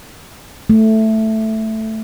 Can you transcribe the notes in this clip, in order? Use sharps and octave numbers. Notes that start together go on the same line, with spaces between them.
A3